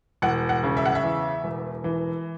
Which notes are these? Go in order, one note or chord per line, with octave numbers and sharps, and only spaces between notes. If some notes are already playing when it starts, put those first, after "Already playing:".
E1 F#5
F#5
C#3
E5
F#5
E5
E2
E1
E3